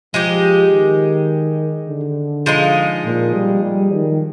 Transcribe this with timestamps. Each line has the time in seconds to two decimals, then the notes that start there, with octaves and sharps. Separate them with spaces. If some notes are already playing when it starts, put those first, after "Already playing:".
0.14 F3 G#3 D#4 G4
0.72 D#3
1.89 D3
2.46 F3 G#3 D#4
3.05 A#2
3.34 G3
3.63 G3
3.92 D#3